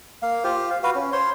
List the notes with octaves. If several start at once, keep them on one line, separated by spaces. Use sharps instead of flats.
A#3 F5
F4 G4 C5
F5
F#4 B4 F5
C#4
C5 C#5 C6